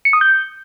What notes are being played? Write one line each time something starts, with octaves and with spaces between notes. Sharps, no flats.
C#7
D#6
G6